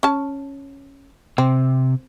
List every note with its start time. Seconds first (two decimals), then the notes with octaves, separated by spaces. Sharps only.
0.03 C#4 A5
1.38 C3 C4